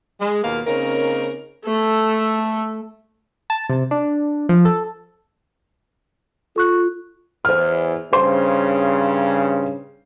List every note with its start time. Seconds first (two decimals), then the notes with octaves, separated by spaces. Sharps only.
0.21 G#3
0.43 D#2 B2 A#3 F4 A#4 F5
0.67 C#3 A#3 C4 C#4 D#4 A#4
1.65 A3 A4
3.50 A5
3.69 C3
3.91 D4
4.49 F3
4.65 A4
6.56 F4 A4 C#6 F#6
7.45 E2 C5 F6
8.13 G2 C#3 C5 C6